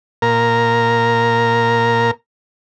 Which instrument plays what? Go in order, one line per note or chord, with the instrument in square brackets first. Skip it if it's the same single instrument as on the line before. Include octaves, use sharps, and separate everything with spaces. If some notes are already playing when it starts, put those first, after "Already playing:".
[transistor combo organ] A#2 A#4 A#5